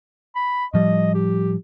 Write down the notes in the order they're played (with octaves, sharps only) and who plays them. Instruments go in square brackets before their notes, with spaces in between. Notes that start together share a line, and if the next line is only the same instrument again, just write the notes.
[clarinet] B5
[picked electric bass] A2 F3 G3 [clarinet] D#5
[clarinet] G4